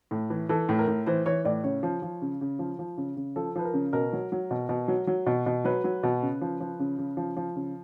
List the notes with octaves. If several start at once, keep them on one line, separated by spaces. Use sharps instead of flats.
A2
E3
E3 A4
A2
A#4
A2
E3 C5
E3 C#5
A2 D5
C#3 C#5
F3
F3
C#3
C#3
F3
F3
C#3
C#3
F3 A4
F3 B4
A#4
C#3
B2 A#4
F#3
F#3
B2
B2
F#3
F#3
B2
B2
F#3 B4
F#3
B2
C#3
F3
F3
C#3
C#3
F3
F3
C#3